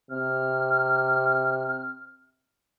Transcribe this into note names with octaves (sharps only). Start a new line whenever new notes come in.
C3 F6